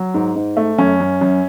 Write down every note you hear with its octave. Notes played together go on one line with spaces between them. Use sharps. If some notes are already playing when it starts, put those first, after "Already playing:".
Already playing: F#3
G#2
G#2
A3
F#2 C#4
F#2
F#2